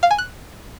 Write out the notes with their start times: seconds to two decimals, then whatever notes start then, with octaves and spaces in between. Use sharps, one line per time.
0.03 F5
0.11 G#5
0.18 F#6